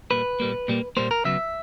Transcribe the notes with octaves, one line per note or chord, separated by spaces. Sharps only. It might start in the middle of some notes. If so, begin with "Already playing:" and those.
A#2 G3 A#3 B4
A#2 G3 A#3
A#2 G3 A#3
A#2 G3 A#3 C5
A#4
C#3 F#3 B3 E5